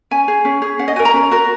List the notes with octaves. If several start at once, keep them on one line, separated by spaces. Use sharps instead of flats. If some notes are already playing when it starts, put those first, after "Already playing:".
C#4 G#5
G#4
C#4
G#4
C#4 F#5
D#5
F#4 A#4 G#5
A#5
C#4
F#4 A#4